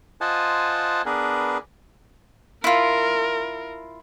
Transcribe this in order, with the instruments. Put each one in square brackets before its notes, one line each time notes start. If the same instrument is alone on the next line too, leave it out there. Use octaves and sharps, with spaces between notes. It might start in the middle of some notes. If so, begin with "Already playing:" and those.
[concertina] F4 C5 D#5 F#5 G#5 A5
B3 D4 G#4 A#4 B4
[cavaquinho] E4 F4 [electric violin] A#4